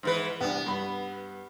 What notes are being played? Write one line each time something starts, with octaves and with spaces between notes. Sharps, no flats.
G#2 E3 B4
C2 B3 D4
G2 B5